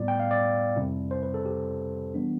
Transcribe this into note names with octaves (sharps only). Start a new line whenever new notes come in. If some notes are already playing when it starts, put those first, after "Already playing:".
Already playing: A2 G3 B3 E4 D5
G5
F5
D5
F2 C3 G3 C4 E4
C5
B4
A4
G4
E3 G3 B3 D4